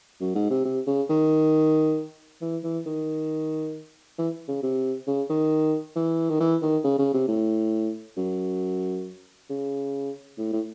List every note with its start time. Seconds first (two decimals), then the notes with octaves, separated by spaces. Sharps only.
0.20 F#2
0.35 G#2
0.50 C3
0.65 C3
0.87 C#3
1.09 D#3
2.41 E3
2.63 E3
2.86 D#3
4.18 E3
4.48 C#3
4.63 C3
5.07 C#3
5.29 D#3
5.95 E3
6.29 D#3
6.40 E3
6.62 D#3
6.84 C#3
6.99 C#3
7.14 C3
7.28 A2
8.17 F#2
9.50 C#3
10.38 A2
10.52 A2